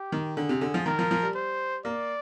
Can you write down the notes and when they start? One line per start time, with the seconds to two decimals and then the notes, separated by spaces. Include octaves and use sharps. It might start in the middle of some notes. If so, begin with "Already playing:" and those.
Already playing: G4
0.12 D#3
0.37 D3 G#4
0.49 C3
0.61 D3
0.74 F3
0.86 D#3 A#4
0.99 F3
1.11 F3
1.23 G3
1.35 C5
1.85 A#3 D5